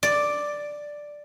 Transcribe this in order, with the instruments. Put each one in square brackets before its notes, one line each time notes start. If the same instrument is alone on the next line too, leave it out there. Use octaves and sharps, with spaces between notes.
[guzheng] D5